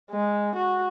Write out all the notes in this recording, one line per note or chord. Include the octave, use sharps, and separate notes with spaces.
G#3
F#4